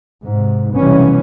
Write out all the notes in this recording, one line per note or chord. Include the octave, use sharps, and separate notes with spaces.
G#2 C3
F1 B1 E3 G3 B3 C#4